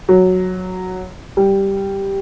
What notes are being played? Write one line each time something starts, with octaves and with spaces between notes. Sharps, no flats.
F#3
G3